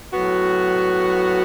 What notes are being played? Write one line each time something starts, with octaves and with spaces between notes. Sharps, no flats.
A2 F#3 B3 F#4